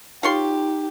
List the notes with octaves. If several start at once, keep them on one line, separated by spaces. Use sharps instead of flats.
D#4 F4 G4 C#5 C6